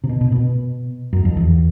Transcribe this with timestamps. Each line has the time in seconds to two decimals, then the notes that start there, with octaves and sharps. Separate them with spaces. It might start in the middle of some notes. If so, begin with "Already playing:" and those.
0.04 C3
0.09 B2
0.21 B2
0.32 B2
1.13 F#2
1.25 F2
1.37 E2